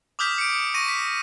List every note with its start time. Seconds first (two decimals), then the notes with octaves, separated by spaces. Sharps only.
0.19 D6 D#6 F6 G6 B6
0.38 C#7 D7
0.74 C#6 A#6 D#7
0.88 B6